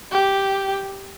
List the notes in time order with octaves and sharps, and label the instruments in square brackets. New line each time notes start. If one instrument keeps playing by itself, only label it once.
[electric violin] G4